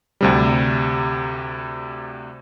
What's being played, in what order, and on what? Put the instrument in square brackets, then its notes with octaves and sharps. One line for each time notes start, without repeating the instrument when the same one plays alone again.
[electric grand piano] D2 C3 G3